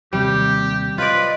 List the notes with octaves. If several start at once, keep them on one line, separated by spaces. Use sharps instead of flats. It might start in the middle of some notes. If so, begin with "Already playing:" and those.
D#2 C3 G3 G4
F4 B4 D5 D#5